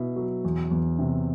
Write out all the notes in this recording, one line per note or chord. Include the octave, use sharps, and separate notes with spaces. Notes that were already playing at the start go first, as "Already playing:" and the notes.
Already playing: B2 E4
F#3
E2
E2
C3